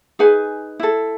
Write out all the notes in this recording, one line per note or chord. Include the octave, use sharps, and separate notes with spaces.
D#4 G#4 B4 G#5
E4 A4